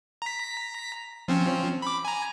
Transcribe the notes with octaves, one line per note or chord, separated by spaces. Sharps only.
A#5 B6
F3 C4 C#4
B5 D6
G#5 A#5